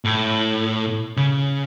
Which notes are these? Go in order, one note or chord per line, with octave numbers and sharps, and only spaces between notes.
A2
C#3